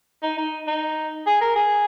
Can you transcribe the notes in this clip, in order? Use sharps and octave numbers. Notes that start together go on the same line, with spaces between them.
D#4
D#4
D#4
G#4
A#4
G#4